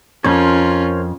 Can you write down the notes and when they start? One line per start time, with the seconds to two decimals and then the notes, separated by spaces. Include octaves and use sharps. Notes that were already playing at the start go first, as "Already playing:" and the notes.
0.24 F2 C#4 F4 A#4 C5 C#5